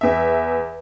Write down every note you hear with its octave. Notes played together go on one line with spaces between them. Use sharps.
E2 E5